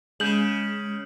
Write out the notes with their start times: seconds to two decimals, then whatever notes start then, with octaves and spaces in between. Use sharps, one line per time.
0.20 C#3 G#3 G6 F#7